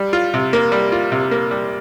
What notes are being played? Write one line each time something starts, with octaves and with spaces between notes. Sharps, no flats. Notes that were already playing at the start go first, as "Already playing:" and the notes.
Already playing: G3
F4
C3
A#3
G3
F4
C3
A#3
G3